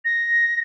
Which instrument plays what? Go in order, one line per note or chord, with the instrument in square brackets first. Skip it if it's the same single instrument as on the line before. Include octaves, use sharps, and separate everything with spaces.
[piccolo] A#6